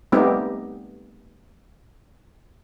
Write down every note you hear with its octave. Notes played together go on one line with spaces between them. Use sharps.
G3 A3 B3 C4 D#4 G4